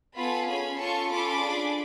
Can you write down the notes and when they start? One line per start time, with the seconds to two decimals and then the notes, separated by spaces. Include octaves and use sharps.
0.16 B3 F4 A4 G#5 B5
0.48 C#4 G#4 G#5 B5
0.79 C#4 F4 A4 A5 C#6
1.11 C#4 F4 A4 B5 D6
1.43 D4 G#4